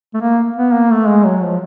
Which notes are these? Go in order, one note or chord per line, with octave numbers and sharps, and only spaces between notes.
A3
A#3
B3
A#3
A3
G#3
F#3
F3